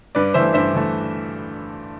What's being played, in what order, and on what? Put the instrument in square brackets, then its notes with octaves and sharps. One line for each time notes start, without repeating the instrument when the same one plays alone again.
[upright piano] G2 B4 D5
E3 A3 C5 E5
G2 C5 E5
E3 A3